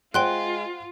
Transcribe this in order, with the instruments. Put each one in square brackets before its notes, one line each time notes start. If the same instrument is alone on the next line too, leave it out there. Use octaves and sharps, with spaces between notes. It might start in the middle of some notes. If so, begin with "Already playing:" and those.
[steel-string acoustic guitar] G#3 [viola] F4 [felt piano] C5 F#5 [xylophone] G5 C6 F#6